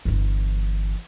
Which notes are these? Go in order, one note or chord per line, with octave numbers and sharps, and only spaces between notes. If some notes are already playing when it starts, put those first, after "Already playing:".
G1 E3